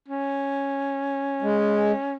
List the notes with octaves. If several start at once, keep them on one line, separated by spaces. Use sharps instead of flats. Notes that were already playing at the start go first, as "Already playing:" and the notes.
C#4
G#3